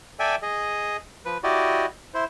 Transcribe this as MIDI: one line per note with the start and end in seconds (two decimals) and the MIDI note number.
0.19 0.36 69
0.19 0.36 74
0.19 0.36 76
0.19 0.36 79
0.19 0.36 80
0.42 0.97 68
0.42 0.97 75
1.25 1.38 53
1.25 1.38 71
1.43 1.86 64
1.43 1.86 66
1.43 1.86 67
1.43 1.86 74
1.43 1.86 75
2.14 2.24 64
2.14 2.24 72